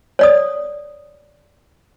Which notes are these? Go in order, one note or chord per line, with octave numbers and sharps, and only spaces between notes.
C#5 D5 D#6